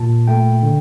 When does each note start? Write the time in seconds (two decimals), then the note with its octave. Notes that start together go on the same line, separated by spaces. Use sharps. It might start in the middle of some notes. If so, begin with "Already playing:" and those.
Already playing: A#2 A5
0.27 A3 G5
0.63 D3